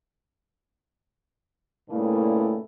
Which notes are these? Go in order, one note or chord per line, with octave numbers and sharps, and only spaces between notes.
G2 A#2 C#3 A3 E4